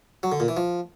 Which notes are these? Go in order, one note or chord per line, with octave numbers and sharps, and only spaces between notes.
F#3
D3
A#2
E3
F3